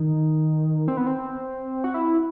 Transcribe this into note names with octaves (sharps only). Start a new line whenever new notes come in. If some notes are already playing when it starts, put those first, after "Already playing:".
Already playing: D#3
C4
B3
C4
F#4
E4